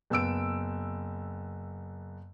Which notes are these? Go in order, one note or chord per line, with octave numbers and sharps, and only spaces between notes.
F#1 B3 E6 D7